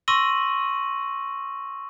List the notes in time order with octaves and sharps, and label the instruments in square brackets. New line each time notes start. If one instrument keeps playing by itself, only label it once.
[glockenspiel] C6 C#6 E6 A#6 D#7 F#7